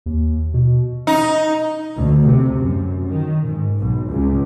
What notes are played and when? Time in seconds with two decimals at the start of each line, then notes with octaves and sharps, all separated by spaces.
0.06 D#2
0.54 B2
1.07 D#4
1.96 D2
2.26 C3
2.56 F#2
3.08 D#3
3.47 G#2
3.78 B1
4.10 C#2